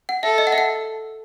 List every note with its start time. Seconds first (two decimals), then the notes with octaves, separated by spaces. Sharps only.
0.09 F#5
0.23 A4 E5
0.38 D#5
0.47 F#5
0.52 E5
0.58 F#5